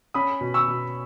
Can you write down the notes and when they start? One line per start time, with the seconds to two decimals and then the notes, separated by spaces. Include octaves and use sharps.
0.14 C#4 B5 D#6
0.41 B2
0.54 C#6 E6
0.68 B2